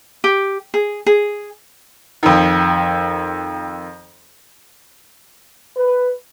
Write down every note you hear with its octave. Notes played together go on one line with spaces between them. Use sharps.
G4
G#4
G#4
F2 D#3
B4